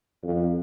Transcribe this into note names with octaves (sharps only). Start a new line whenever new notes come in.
F2